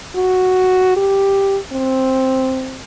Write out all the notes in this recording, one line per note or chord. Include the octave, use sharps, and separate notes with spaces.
F#4
G4
C4